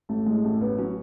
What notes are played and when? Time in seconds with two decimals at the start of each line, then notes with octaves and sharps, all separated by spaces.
0.09 A1 A3
0.26 A2 G#3
0.44 A1 A3
0.61 A1 B3
0.78 F#3 C#4